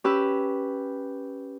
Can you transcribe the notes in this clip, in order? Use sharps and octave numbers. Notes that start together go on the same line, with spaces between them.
C#4 G4 B4 E6